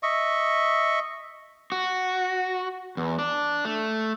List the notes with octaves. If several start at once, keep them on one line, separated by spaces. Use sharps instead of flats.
D#5 E5 C#6
F#4
E2
D4
A3